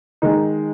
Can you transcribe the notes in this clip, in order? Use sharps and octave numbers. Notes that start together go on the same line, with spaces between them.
D#3 G#3 D#4